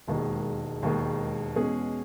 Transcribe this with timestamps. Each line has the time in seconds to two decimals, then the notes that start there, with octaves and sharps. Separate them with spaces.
0.08 E1 D#2 D#3 G#3
0.82 E1 D#2 D#3 G#3
1.56 E2 B2 G#3 C#4 G#4